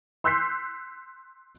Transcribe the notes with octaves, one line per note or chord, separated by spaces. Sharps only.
C6 E6 F#6 G6 B6 C7